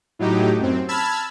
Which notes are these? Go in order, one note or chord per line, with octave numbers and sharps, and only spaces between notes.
A2 F#3 D#4 G4
F#2 C4
A5 B5 E6 F6 G#6